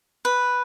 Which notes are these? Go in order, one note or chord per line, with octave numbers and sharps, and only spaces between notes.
B4